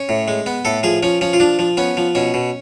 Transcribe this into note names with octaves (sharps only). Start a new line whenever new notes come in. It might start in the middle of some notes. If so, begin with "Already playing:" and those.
Already playing: C#4
A2
G#3
B3
A2 A4
F3 G#4
F3 C#4
F3 C#4
F4
F3 D4
F3
B3 C#4
F3
B2 C#4
B2